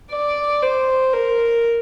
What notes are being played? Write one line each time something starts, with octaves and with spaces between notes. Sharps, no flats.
D5
C5
A#4